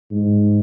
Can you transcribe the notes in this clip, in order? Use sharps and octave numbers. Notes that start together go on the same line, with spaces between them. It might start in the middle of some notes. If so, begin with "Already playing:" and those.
G#2